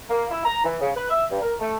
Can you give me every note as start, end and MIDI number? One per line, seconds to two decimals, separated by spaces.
0.10 0.26 58
0.31 0.43 64
0.44 0.64 82
0.65 0.76 52
0.81 0.90 49
0.95 1.08 71
1.10 1.23 76
1.30 1.38 43
1.42 1.53 70
1.60 1.76 57